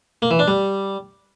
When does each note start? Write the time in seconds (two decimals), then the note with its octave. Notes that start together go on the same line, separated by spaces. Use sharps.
0.22 A#3
0.31 E3
0.39 D4
0.48 G3